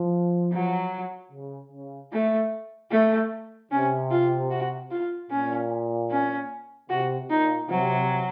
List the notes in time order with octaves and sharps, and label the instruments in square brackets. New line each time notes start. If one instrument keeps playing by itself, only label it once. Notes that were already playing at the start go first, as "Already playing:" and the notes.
Already playing: [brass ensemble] F3
[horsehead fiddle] F#3
[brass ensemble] C#3
C#3
[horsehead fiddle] A3
A3
[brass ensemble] C3 [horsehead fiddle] C#4
[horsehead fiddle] F4
F#4
F4
[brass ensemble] A#2 [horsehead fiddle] C#4
[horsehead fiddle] C#4
[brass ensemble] C3 [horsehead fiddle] F#4
[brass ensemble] A#2 [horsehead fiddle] D#4
[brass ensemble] C3 [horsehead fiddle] F#3